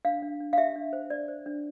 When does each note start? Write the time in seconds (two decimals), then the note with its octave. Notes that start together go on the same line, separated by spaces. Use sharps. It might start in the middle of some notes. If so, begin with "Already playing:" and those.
0.05 D4 F5
0.22 D4
0.40 D4
0.53 F5
0.58 G4 E5
0.76 D4
0.93 C5
1.10 D4 D5
1.28 C5
1.46 D4